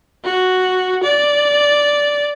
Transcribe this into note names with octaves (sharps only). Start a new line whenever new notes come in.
F#4
D5